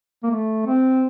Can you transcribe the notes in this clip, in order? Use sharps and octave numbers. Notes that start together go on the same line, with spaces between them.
A#3
A3
C4